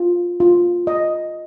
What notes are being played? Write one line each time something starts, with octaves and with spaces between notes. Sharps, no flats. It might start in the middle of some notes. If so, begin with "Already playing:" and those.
Already playing: F4
F4
D#5